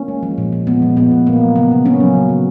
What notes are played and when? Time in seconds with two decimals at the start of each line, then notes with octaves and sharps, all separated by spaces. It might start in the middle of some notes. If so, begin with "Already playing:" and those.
Already playing: A#3 C#4
0.08 G#3
0.23 F3
0.38 A#2
0.53 A#2
0.67 G#3 B3
0.82 F3
0.96 A#2 B3
1.11 A#2
1.27 A#3
1.41 F#3
1.56 C#3 B3
1.71 C#3
1.86 A#3 C#4
2.00 F#3
2.15 C#3
2.29 C#3